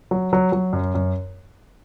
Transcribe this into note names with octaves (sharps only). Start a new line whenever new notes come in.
F#3
F#3
F#3
F#2
F#2